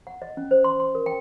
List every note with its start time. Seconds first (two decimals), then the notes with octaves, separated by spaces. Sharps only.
0.07 F#5
0.22 D#5
0.37 C#4
0.51 C5
0.64 C6
0.80 C6
0.95 A#4
1.06 G5